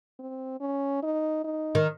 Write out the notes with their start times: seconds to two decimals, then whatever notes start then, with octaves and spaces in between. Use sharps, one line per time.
0.19 C4
0.60 C#4
1.03 D#4
1.44 D#4
1.75 D#3